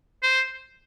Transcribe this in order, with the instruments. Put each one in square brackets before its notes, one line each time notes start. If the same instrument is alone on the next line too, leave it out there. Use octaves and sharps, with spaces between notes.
[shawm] C5